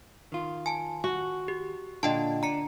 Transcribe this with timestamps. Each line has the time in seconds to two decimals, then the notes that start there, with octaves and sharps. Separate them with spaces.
0.32 D#3 F4
0.66 G#5 A5
1.04 F#4
1.48 G4
2.03 A#2 D3 F4 D#5 G5 A5
2.43 D4 A#5 C#7